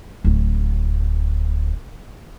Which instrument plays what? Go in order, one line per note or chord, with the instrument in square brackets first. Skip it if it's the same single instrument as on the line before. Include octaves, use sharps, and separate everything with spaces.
[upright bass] D1 D2